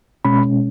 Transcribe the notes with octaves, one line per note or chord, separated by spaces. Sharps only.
B2 G#3 C#4 B5